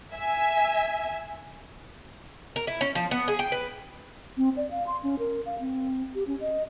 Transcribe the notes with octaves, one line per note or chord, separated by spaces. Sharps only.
E5 G#5
A#4
E4
C#4
F3
B3
G#4
G5
B4
C4
D5
F5
C6
C#4
A#4
F5
C4
G4
C#4
D#5